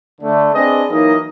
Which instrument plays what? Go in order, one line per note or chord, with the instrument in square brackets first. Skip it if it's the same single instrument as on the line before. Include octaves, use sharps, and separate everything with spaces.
[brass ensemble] D3 A3
C4 D4 G#4 B4 D#5
E3 F#3 A#3 D#4 A#4 D#5